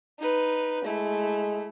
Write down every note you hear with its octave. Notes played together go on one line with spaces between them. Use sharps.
D#4 B4
G#3 A3 E4